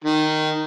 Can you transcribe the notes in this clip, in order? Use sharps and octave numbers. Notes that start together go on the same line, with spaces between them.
D#3